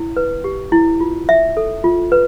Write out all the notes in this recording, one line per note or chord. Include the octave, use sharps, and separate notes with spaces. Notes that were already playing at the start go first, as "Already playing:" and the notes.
Already playing: E4
B4
G4
E4
F4
E5
A4
F4
B4